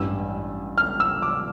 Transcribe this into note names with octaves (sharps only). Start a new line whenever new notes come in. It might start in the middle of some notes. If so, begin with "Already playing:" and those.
Already playing: A1 G2 E3 G3 E6
F6
E6
D6